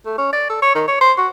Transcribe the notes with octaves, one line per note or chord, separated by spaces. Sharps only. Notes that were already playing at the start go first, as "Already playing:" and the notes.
A3
C#4
D5
A4
C#5
D#3
C#5
C5
F#4